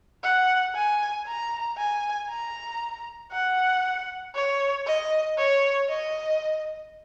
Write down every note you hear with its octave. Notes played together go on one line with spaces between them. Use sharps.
F#5
G#5
A#5
G#5
A#5
F#5
C#5
D#5
C#5
D#5